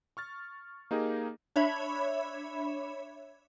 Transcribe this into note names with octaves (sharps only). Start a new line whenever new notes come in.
C#6 F6 A6
A#3 D#4 G4 G#4 A#4
D4 C#5 E5 B5 G#6